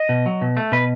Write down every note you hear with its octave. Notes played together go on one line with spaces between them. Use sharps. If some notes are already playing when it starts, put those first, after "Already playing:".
Already playing: D#5
B2
F#3
B2
A3
B2 B4